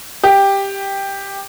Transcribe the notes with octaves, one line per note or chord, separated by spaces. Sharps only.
G4